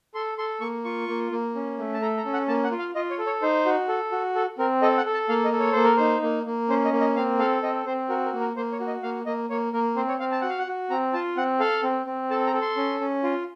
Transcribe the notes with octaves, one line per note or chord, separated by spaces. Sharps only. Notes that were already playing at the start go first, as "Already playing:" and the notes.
A4 C6
A4 C6
A#3 C#6
F4 C#6
A#3
A#3
C#4
A3
A5
A4 A#5
A#5
C#4
F#5
A#3 A5
F#5
F4
F5
F4 D#5
C#5
A4
C#5
D#4 C5
F#4
A4
F#4
A4
C4 A#4
A4 D#5
F#5
A4
A5
A#3 F5
D#5
A4
C#5
A#3 C5
A#4
D#4 C5
A#3
A#3
C#4 C5
D#5
A#3
D#5
C4 F5
A4 F5
C4 D#5
C4 C5
F#4 A#4
A#4
A#3
A#4
A#3 C5
C#5
F#4
D#5
A#3 F5
A#3 D#5
A#3 C#5
A#3 A#4
C4 C5
C#5
C4 F5
A5
F#4 F#5
F5
F#5
F#4
C4 A#5
F4 A5
C4 F#5
A4 F5
C4
C4
A4 A5
A#5
A4
C6
C#4
C#4
F4